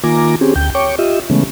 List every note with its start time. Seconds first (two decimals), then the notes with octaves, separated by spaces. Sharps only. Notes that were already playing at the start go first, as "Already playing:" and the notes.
0.04 D#3 A#3 F4 G#5 A#5 D6
0.41 C4 C#4 G4 G#4
0.56 D2 G5 G6
0.75 C#5 G5 C#6 D6
0.99 F4 G4 D#5 E5
1.30 C#3 E3 G#3 A3 B3 C#4